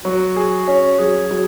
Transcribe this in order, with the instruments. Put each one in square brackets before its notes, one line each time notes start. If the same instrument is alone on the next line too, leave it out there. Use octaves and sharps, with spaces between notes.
[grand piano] F#3 [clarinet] F#4
[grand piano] G#4
C#4
[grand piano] F#3 [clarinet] G#4
[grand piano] F#3